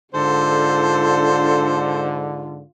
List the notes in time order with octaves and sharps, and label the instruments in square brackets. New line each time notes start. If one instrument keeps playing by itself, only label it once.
[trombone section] G#2 D3 [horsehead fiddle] D4 F4 [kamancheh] A4 [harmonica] C5